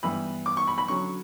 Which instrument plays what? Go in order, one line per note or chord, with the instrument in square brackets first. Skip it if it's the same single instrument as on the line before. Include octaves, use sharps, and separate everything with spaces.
[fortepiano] G2 E3 B3 B5
D6
C#6
B5
B5
D3 F#3 C#4 C#6